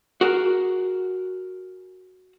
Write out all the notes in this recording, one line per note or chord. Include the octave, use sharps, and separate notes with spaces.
F#4 G#4 A#4